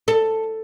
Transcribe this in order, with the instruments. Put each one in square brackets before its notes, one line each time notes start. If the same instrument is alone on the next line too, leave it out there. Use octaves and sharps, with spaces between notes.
[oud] A4